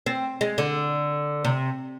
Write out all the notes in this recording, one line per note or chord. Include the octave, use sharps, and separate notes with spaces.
C4
G#3
D3
C3